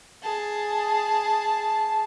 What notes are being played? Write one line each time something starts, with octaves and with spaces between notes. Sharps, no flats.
G#4 A5